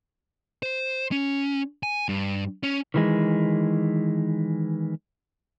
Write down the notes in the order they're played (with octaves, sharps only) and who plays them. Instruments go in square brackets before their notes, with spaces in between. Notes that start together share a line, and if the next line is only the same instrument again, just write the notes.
[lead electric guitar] C5
C#4
G#5
G2
C#4
[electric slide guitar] D#3 E3 G#3